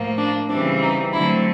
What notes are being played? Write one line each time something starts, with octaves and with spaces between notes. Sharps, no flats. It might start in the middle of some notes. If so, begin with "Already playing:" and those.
Already playing: A2 F3 A#3
D4
C#3 E3 G3 C4 D4
D#4
D3 F#3 A3 C4 E4